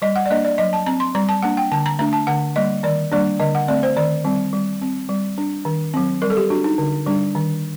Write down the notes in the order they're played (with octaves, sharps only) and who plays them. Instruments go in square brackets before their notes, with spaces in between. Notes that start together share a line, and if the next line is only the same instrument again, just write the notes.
[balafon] G3 D#5
F#5
D5
A#3 D4 D#5
D5
F#3 D#5
A5
C4 A#5
C6
G3 A#5
A5
A#3 D4 F#5
G5
D3 A5
A#5
A3 D4 A#5
A5
D3 F#5
G3 A#3 D#5
D#3 D5
G3 A#3 D4 D5
D3 D#5
F#5
A3 C4 D5
C5
D#3 D5
G3 C4
G3
C4
G3
D4
D#3
F#3 C4
G3 A#4
A4
G4
D4 F#4
D#4
D3
G3 D4
D#3